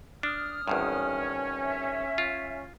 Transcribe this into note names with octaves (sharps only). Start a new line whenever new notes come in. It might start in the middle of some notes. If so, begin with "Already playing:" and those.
D4 D#6 F6
G#1 E2 G2 C#4
E5
F4